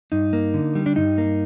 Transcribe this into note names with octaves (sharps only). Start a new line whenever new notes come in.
G2 D#4
A#3
D3
G3
D4
G2 D#4
A#3